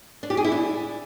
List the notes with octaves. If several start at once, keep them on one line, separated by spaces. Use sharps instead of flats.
D4
G4
G#4
E4
D4